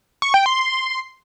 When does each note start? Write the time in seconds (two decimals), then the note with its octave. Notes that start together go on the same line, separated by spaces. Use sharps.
0.22 C#6
0.34 G5
0.46 C6